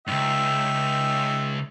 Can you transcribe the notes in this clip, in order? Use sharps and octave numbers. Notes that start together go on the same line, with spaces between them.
C#2 G2 D#4 E5 G5